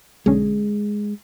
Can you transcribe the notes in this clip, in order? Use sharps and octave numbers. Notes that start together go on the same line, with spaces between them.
B1 D3 G#3 C#4